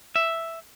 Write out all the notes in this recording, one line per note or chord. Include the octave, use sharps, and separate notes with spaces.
E5